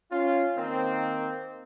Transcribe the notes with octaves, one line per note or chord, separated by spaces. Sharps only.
C#4 F4
D#3 A#3 C4